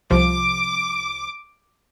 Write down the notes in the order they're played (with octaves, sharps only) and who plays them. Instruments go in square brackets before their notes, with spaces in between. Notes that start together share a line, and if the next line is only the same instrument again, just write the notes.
[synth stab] C2 C3 F3 [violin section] D6